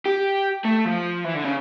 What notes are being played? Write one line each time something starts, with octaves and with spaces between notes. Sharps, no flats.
G4
A3
F3
E3
D3
C#3